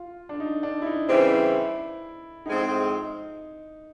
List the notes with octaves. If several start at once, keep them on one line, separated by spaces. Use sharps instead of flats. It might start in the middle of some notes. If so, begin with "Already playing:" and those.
Already playing: F4
D4
D#4
D4
E4
D#4
C#3 E3 G3 C4 E4
A2 F3 G#3 C4 D#4